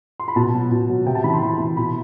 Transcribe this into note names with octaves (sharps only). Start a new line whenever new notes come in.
C6
B5
B2 A5
F#3
B2
F#3
C3 G5
A5
E3 B5
C6
C3 B5
E3
B2 B5